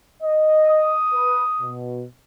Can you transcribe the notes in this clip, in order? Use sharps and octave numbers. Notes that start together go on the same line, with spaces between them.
D#5
D#6
B4
B2